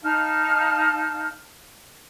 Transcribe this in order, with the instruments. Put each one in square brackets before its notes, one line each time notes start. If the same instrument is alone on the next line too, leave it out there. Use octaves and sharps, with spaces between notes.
[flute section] D#4 F5 A5 F6